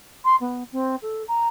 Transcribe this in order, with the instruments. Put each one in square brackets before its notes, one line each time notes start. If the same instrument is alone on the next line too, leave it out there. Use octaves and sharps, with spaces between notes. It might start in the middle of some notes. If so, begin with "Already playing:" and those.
[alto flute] C6
B3
C4
A4
A#5